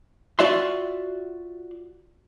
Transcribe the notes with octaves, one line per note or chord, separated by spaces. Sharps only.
F4 F#4 D5 E5 C6